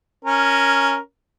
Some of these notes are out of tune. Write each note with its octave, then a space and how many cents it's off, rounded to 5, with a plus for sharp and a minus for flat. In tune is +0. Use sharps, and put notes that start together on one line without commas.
C#4 +0 A#4 +0